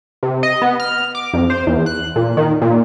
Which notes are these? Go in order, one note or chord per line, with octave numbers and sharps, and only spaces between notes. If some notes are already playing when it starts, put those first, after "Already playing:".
C3
D#5
B3
F6
D6
F2
C5
E2
F#6
A#2
D#3
A#2